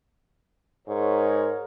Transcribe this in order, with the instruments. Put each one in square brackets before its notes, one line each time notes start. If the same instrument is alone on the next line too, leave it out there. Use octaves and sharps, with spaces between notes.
[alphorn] G#2 [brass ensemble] A#4 C#5